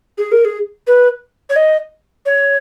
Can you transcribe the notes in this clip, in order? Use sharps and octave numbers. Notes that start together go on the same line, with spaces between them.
G#4
A#4
G#4
B4
C#5
D#5
C#5